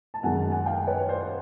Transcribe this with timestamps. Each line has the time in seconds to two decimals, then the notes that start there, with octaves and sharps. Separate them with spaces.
0.14 A5
0.23 F#2 D#3 G#3 F#5 G#5
0.51 F#5 G#5
0.66 F5 G5
0.87 B4 C#5
1.09 C5 D5